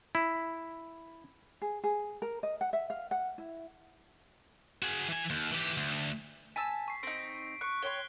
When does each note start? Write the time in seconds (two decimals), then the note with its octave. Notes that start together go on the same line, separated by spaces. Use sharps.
0.15 E4
1.62 G#4
1.84 G#4
2.22 A#4
2.43 D#5
2.61 F#5
2.73 E5
2.90 F5
3.11 F#5
3.38 E4
4.82 F#4 G#4
5.09 E3 G#5
5.30 D#2
5.52 E3 G4
5.77 D2
6.56 G#5 A5 E6 B6
6.88 C#6 C7
7.03 C4 D#4 D7
7.61 C#6 F#6
7.82 C#5 G5 C6 G7